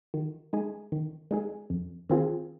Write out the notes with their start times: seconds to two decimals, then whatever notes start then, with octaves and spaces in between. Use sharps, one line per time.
0.14 D#3
0.53 G#3 D#4 G#4
0.92 D#3
1.31 G#3 D#4 G#4
1.70 F2
2.09 D#3 C4 F4 G#4